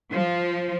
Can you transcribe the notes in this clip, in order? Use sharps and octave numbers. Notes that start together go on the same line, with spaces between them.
F3